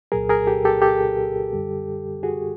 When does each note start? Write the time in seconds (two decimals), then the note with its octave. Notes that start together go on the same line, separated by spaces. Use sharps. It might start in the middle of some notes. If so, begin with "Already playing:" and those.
0.12 C2 A#2 F#3 G#4 A#4
0.29 G#4 A#4
0.47 G4 A4
0.65 G4 A4
0.82 G4 A4
1.53 F#2 D3 G3
2.23 F#4 G#4